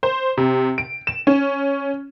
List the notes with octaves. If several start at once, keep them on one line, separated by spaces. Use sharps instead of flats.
C5
C3
D7
E7
C#4